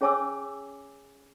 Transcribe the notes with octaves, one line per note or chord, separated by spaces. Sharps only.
C#4 G#4 C#5 G#5 D6 E6